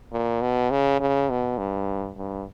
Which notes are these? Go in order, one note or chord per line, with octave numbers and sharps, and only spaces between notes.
A#2
B2
C#3
C#3
B2
G2
G2